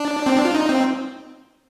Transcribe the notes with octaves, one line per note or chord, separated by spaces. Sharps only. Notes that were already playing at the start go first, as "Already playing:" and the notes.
Already playing: D4
C4
D4
F4
D#4
C4